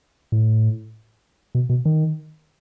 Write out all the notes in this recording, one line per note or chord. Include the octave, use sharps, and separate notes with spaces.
A2
B2
B2
D#3